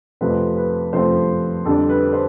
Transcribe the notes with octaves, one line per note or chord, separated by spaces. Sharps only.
F2 C3 F3 A3 C4 B4
B4
F2 C3 F3 A3 C4 C5
F2 D3 G3 D4 A4
B4
C5